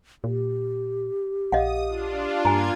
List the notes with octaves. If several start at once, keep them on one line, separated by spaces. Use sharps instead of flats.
A#2 G4
A#1 D#5 F5 F#5 D#6
D4 F4
G2 A#3 F4 G#5 A#5 G#6